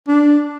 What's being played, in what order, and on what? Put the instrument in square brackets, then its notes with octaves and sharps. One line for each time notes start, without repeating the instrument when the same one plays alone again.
[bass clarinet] D4